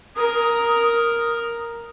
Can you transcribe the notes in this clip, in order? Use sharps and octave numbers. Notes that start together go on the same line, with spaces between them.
A#4 D#6